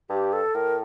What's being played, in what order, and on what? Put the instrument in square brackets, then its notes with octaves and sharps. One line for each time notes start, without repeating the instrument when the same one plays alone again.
[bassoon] G2 [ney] G4
[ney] A4
[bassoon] A2 [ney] A#4